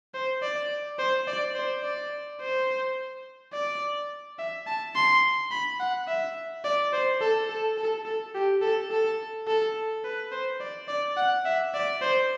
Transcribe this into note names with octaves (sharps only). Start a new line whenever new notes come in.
C5
D5
C5
D5
C5
D5
C5
D5
E5
A5
C6
B5
F#5
E5
D5
C5
A4
A4
A4
A4
G4
A4
A4
A4
B4
C5
D5
D5
F#5
E5
D5
C5